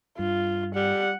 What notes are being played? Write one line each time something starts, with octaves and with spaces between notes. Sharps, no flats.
G2 F4
G3 F#5